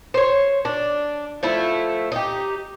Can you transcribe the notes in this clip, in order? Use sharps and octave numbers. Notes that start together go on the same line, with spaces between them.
C5 C#5
D4
F3 A3 E4
D#4 G4